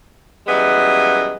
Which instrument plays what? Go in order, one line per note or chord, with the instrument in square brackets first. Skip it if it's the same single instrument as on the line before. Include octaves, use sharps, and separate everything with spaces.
[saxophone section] F#2 E3 G3 G#3 B3